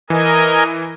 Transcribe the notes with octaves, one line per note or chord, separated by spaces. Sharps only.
E3 A#4 D#5 G#5